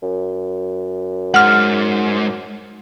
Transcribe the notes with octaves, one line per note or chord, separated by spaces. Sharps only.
F#2
G#2 F#5 F6